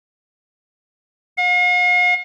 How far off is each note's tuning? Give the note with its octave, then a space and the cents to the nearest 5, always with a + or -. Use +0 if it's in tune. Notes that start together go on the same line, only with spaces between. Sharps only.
F5 +45